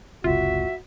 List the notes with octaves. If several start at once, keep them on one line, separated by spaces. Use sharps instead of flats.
F#1 C#2 C3 F4 F#4 E5